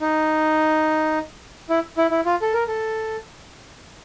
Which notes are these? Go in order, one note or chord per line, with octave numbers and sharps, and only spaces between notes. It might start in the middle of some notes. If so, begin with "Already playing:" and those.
D#4
E4
E4
E4
F4
A4
A#4
A4